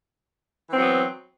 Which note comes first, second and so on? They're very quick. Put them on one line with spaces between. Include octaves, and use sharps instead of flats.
E3 C4 F#3 B3